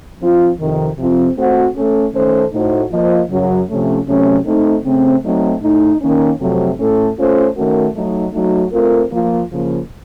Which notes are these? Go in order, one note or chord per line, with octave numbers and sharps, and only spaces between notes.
F3 C4 F4
F2 C3 D#3
F2 C3 F3 C4 F4
A3 C4 F#4 C5
A3 C#4 A4
D#3 A3 C#4 A4 C5
A2 A3 D#4 F#4 C5
F3 A#3 F4 C5 D#5
F#2 C#3 F#3
C3 F3 A3 C#4
C3 F#3 A3 C#4
A3 C4 D#4
C#3 A3 C4
F#3 A3 C4 D#4
A2 A3 D#4
D#3 A#3 C#4
F2 C3 F#3 A3 C4
A2 A3 C#4 A4
A3 C#4 F4 A4 C5
D#3 A3 C#4 F#4 A#4
F#3 A3 D#4
F#3 A3 D#4 F#4
A3 C4 F4 A#4
F3 A#3 F4
C#3 F3 A#3